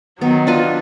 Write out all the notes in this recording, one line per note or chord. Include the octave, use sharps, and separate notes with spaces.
D#3 F#3 B3
D4 F4 B4